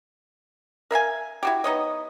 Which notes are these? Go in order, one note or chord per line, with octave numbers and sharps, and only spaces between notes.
A#4 E5 F5 G#5
E4 F#4 G4
B3 D#4 C#5 D#5